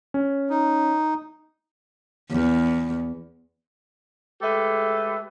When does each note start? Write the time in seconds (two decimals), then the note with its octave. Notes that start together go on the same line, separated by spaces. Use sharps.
0.14 C#4
0.50 D#4
2.31 E2
4.42 G#3 A3 G4 A4 B4